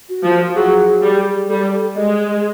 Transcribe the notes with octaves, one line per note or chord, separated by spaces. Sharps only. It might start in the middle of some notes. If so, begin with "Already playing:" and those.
F#4
F3
F#3 G#4
G3
G3 A4
G#3 D#5